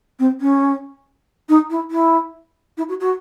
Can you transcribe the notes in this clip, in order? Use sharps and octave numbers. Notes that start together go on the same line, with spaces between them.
C4
C#4
D#4
E4
E4
E4
F#4
F#4